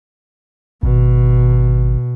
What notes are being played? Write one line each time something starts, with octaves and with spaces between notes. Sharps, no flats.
G#1 B2